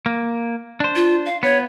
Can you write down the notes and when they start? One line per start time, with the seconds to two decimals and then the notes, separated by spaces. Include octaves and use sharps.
0.06 A#3
0.80 D4 C5
0.96 F4
1.26 F5
1.43 B3 C#5